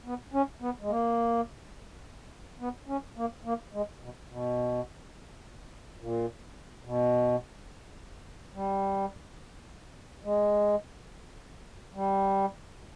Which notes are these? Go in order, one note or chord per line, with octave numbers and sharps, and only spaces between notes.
B3
C#4
B3
G#3
A#3
B3
C#4
A#3
A#3
G#3
B2
B2
A#2
B2
G3
G#3
G3